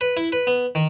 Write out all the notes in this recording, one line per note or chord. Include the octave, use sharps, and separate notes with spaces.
B4
E4
B4
B3
D#3